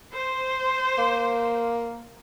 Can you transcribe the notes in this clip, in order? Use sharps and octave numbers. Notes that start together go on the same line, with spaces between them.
C5
A#3